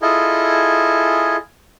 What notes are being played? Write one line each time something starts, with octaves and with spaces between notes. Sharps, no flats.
E4 F4 G#4 A4 D#5 G#5